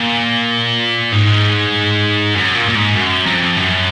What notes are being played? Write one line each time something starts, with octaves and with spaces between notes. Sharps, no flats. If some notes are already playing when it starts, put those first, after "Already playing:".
Already playing: A#2
G#2
F#2
A#2
A#2
G#2
F#2
F2
F#2